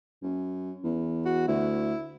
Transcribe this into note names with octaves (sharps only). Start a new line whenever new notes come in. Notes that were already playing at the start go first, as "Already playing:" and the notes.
F#2
E2
F#4
D2 E4